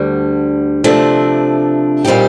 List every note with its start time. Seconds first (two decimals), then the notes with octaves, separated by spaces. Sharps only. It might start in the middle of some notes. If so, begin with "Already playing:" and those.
Already playing: D2 D3 G3
0.84 C3 F3 A3 D4
2.05 A#2 G3 C4 D#4 G4